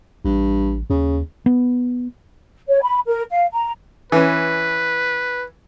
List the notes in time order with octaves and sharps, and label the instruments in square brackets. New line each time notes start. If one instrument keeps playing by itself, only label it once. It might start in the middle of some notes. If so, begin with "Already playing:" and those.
[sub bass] A1 [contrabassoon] G2
[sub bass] D#2 [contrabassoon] C#3
[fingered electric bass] B3
[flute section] C#5
B5
A#4
F5
A#5
[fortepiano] E3 C#4 [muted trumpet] B4